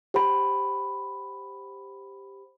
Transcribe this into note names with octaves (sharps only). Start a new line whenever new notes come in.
G4 C5 F#5 B5